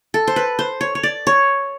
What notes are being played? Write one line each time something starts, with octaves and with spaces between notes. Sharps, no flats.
A4
C5
B4
C5
C#5
C#5
D5
C#5